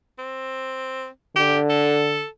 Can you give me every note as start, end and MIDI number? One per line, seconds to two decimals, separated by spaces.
0.19 1.07 60
1.36 2.23 50
1.36 1.58 67
1.69 2.27 69